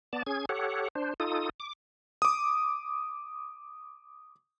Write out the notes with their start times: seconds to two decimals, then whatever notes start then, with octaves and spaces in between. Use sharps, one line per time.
0.13 B3 D5 A5
0.27 C#4 G#4 G#6
0.49 G4 A4 C#5 F#5
0.95 D4 C5
1.20 D#4 F4 A4 D#6
1.60 D6
2.22 D6 D#6